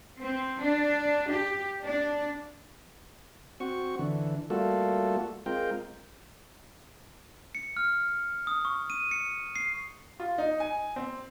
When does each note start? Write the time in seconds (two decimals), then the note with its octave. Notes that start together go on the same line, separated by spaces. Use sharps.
0.17 C4
0.61 D4
1.30 G4
1.83 D4
3.60 C4 F#4 C#6
3.99 D3 E3
4.50 G3 A3 A#3 F4 F#4 A4
5.46 G#3 C4 F4 A#4 G5
7.55 C#7
7.77 F6
8.47 D#6
8.65 C#6
8.90 D#7
9.11 C#7
9.56 C7
10.20 F4
10.38 D#4
10.60 G#5
10.96 C4